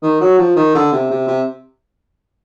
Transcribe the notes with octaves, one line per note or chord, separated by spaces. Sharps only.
D#3
F#3
F3
D#3
D3
C3
C3
C3